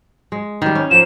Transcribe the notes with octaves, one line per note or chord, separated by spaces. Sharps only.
G#3
D#3 G3
C#4
F3 A#3 E7